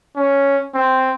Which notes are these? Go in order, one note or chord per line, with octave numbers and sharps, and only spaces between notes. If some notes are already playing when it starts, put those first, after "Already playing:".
C#4
C4